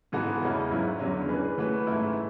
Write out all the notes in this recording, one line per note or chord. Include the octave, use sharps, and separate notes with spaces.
G#2 E3 B3 F#4 A4
E2 C#3 G#3 C#4 E4
G#2 F#3 C#4 E4
E2 D3 F#3 C#4
E3 G#3 C#4 G#4 B4
E3 A3 C#4 F#4 B4
G#2 E3 A3 E4